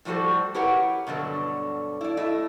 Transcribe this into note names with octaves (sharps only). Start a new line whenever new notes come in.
A2 F3 G3 F#4 A4 C5
E4 G4 A#4 B4 C#5 F#5
G2 B2 D3 F#3
E4 D5
A3 E4 D#5